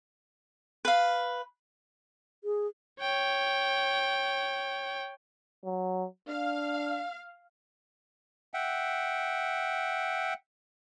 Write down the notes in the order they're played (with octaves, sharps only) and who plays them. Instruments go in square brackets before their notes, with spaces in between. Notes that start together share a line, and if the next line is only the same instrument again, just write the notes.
[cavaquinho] B4 F5
[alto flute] G#4
[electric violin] C#5 G5
[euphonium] F#3
[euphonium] D4 [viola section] F5
[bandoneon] E5 F#5 G5